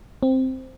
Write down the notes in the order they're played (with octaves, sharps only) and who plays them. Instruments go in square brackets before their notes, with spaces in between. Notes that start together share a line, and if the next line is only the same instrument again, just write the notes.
[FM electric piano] C4